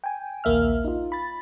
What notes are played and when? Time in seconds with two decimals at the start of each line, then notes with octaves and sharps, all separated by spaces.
0.04 G5 G#5
0.44 A#1 D#2 A#3 E5 F6
0.84 D#4 F4
1.12 B5 A6